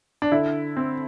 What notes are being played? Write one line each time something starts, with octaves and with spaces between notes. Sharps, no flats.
D4
D3 E4
C4